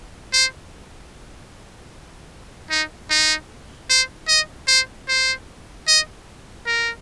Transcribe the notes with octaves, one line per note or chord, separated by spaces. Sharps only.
C5
D#4
D#4
C5
D#5
C5
C5
D#5
A#4